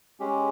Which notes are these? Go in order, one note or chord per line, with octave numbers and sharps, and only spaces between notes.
G#3 C#4 G4